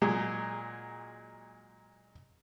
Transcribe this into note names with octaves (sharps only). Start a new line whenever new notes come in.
A#2 F#3 G#3